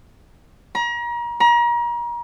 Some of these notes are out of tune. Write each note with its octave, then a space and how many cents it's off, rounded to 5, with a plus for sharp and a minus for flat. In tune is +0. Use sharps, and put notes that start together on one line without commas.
A#5 +35
A#5 +35